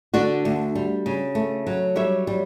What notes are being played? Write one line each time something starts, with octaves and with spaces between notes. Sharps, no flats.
D3 D4 F#4
D2
G3
C#3
A3
F#3
G3 C#5 E5
G3